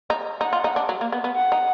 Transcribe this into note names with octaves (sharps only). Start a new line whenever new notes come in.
D#4
D#4 F#5
F4
D#4
D4
F#3
A#3
B3
B3
F#5
D#4